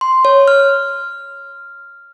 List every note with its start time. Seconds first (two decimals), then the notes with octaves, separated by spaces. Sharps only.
0.01 C6
0.25 C#5
0.48 F6